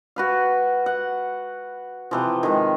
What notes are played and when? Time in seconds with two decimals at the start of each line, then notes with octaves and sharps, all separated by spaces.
0.16 F#4 B4 F5
0.86 F#5
2.11 C3 E3 F3
2.43 D#3 G#3